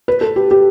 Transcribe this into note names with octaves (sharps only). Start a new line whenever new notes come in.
B4
A4
G4
G4